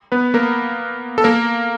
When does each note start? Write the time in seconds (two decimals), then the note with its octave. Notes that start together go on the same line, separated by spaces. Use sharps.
0.12 B3 B4
0.34 A#3 A#4
1.18 A4
1.24 A#3 A#4